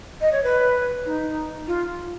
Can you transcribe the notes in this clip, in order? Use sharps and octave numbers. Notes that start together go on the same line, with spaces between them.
D#5
C#5
B4
D#4
F4